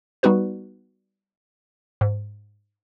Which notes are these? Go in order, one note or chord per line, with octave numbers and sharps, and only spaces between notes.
G3 B3 D#4 F#4 B4
G#2